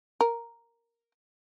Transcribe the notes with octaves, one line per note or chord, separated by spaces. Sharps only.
A#4